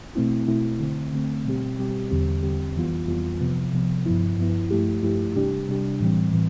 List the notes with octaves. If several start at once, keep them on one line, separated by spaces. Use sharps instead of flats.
B2 A3 C4 E4
B2 A3 C4 E4
D3 A3 C4
D3 A3 C4
B2 G3 C4 G4
B2 G3 C4 G4
E2 D3 G3 C4 G4
E2 D3 G3 C4 G4
F2 E3 G3 B3 F4
F2 E3 G3 B3 F4
C3 F3 B3
C3 F3 B3
G2 F3 B3 E4
G2 F3 B3 E4
G2 F3 A3 E4 G4
G2 F3 A3 E4 G4
C3 G3 D4 G4
C3 G3 D4 G4
A2 E3 G3 C4
A2 E3